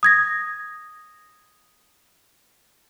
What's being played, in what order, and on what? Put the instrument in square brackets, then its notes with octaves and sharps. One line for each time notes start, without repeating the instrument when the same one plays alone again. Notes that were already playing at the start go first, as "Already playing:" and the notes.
[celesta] D#6 G#6 A#6